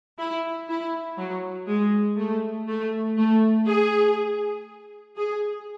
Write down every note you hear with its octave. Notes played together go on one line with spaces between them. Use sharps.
E4
E4
F#3
G#3
A3
A3
A3
G#4
G#4